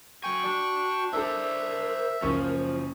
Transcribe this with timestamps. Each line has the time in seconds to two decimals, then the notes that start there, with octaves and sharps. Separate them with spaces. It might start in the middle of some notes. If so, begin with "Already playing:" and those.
0.24 F#3 G5 G#5 C#6
0.44 F#4 D5 A5
1.13 D4 A4 A#4 C5 D5 E5
2.22 F#1 F3 C#4 C#6